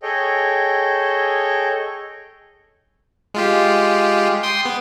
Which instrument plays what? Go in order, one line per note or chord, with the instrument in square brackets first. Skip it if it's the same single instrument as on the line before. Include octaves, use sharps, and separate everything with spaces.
[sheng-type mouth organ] G#4 A4 C#5 D#5 G5
[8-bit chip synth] G#3 F4 G4
G5 C6 D#6
B3